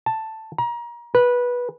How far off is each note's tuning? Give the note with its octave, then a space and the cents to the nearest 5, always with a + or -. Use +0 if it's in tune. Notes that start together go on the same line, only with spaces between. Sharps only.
A5 +5
A#5 +30
B4 -15